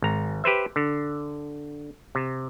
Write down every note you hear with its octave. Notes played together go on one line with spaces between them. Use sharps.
G#1 A#5
G4 B4 C5 E5
D3
C3